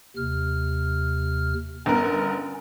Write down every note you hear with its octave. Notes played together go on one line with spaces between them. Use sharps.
D#2 C3 F6
G1 B3 C#4 A#4